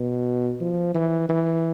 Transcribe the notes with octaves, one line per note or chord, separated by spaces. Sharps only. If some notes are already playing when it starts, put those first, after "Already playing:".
Already playing: B2
F3
E3
E3